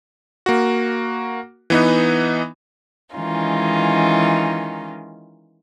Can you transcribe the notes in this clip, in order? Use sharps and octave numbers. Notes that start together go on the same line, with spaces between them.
A#3 F#4
E3 B3 D#4
D#3 E3 G#3 C#4 D#4 F4